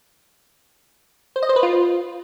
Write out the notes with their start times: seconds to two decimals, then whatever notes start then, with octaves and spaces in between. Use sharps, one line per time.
1.36 C5
1.43 D#5
1.49 C5
1.56 B4
1.63 F4